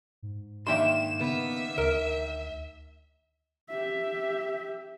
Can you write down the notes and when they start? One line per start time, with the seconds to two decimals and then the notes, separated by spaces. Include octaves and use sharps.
0.23 G#2
0.67 D#3 A#3 D4 E5 G5 C6 E7
1.21 C#3 B3 E5
1.78 D2 A#4
3.69 G4 E5